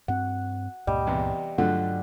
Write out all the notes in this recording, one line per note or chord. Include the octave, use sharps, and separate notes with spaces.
G2 C4 F#5
C#2 G2 A#2 G3 D#5
E2 C3
G2 D3 F3 F#3 A3 D4 F#5